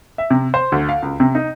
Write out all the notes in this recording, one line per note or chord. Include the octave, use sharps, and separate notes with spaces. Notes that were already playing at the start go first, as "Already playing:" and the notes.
E5
C3
C5
D2
F5
C#2
C3
D#4